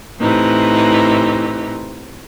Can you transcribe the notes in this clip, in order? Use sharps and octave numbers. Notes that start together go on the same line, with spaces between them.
A2 C3 E3 D#4